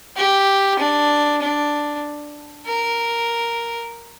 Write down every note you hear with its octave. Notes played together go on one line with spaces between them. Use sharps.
G4
D4
D4
A#4